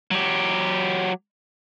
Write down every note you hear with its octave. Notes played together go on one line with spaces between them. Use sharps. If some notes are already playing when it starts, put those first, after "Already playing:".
F#3 G4